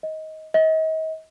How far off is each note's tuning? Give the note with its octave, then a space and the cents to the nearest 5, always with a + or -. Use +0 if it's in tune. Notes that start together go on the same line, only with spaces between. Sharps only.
D#5 +15
D#5 +35